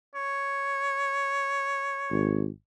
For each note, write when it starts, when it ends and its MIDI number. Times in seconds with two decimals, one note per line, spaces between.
0.15 2.45 73
2.11 2.48 32